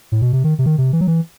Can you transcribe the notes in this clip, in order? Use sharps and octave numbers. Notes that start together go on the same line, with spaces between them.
A2
B2
C3
D#3
C3
D#3
C3
E3
F#3
E3